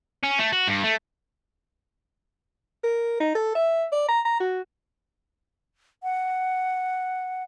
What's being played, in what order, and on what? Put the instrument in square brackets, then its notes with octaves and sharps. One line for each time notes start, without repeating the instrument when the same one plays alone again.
[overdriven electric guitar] C#4
A3
F#4
G2
A3
[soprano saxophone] A#4
D#4
A4
E5
D5
A#5
A#5
F#4
[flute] F#5